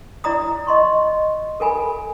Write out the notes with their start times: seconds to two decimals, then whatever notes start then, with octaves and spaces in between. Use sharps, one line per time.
0.24 E4 D5 A#5 D#6
0.67 D#5 C6 C#6
1.60 A4 A#4 G#5 B5